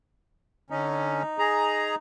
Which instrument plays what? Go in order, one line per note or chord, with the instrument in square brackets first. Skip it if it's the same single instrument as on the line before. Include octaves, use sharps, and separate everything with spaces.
[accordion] D3 C#4 [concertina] D#4
[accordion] G#4 A#5